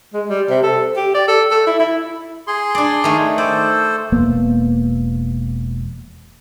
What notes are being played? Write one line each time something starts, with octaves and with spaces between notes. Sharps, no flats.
G#3
G3
C3
A4
G4
D5
A4
A4
E4
E4
G#4 C6
D4 D5
D#3 A3
A4 C5 D5
E1 A#3 B3